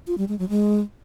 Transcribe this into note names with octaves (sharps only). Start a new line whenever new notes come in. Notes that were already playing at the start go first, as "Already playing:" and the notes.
F4
G3
G#3
F#3
G#3